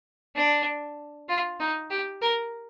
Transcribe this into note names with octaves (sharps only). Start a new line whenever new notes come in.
D4
F4
D#4
G4
A#4